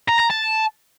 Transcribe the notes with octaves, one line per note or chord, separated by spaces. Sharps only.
A#5
A#5
A5